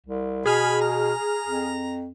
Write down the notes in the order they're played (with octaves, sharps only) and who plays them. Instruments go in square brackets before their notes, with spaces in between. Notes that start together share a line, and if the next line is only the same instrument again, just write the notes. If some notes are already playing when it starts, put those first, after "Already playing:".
[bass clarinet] C2
[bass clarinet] B2 [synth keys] G#4 F6 [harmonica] G#5 B5
[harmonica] A#5
[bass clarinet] F2